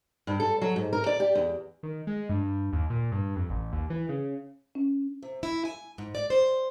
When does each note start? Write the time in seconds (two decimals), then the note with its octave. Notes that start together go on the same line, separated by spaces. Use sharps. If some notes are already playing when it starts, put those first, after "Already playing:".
0.27 G2
0.40 A4
0.61 F#3
0.76 G#2
0.93 A#4
1.06 D5
1.20 G4
1.35 E2
1.83 D#3
2.07 G#3
2.29 G2
2.73 D#2
2.90 A#2
3.12 G2
3.36 F2
3.50 A1
3.72 D#2
3.90 E3
4.09 C#3
4.75 C#4
5.23 C3
5.43 E4
5.65 G#5
5.98 G#2
6.15 D5
6.30 C5